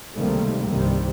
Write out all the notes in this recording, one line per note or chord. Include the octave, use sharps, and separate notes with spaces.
C#2 C3 D#3 G3 A3 A#3
C2 G2 C3 D#3 G3